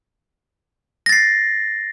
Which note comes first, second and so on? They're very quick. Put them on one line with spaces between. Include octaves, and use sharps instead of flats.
A#6 A6 C7